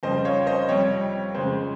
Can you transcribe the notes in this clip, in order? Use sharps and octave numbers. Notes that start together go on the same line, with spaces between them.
F2 C#3 G3 C5 D#5
C#5 F5
C5 D#5
F2 C3 G3 C#5
F2 C#3 G#3 C5